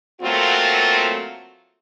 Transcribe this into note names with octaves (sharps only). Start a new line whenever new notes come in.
F#3 A3 A#3 C4 F4 F#4